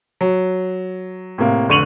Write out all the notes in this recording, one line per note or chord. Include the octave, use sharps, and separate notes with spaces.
F#3
A2 C3 A#3
F1 D3 C#6 D#7 F7 F#7